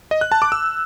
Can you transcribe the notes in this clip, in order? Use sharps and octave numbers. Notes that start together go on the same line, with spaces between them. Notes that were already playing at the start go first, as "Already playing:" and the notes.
D#5
F#6
A5
D6
E6